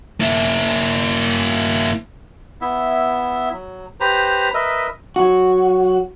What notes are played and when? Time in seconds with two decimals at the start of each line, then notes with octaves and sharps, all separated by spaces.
0.20 A#3 E4
2.61 B3 E4 E5
3.53 F#3
4.00 G4 B4 C5 A#5
4.54 A#4 B4 D#5 E5
5.16 F#3 F#4